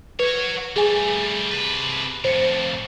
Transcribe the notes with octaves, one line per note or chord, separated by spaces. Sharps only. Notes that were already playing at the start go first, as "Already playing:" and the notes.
F#4 B4 C#5 G#6
G3 A3 G#4 G#5
C3 B4
F2 A2 C5 C#7